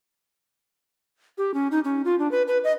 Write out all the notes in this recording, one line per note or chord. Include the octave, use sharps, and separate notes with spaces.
G4
C#4
D#4
C#4
F4
D4
B4
B4
D#5